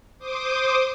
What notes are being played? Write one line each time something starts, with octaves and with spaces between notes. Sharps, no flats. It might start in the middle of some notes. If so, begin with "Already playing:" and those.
C5 D6 D#6